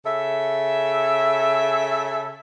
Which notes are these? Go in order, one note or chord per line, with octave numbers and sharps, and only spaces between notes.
C#3 A4 E5